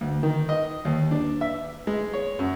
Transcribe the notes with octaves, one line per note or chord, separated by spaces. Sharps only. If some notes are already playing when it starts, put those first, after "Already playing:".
D2
D#3
D#5
D#2
D4
E5
G#3
C#5
F#2